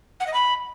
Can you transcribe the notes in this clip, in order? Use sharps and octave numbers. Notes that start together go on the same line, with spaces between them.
F#5
D#5
B5